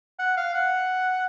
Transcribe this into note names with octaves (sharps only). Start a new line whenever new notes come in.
F#5
F5
F#5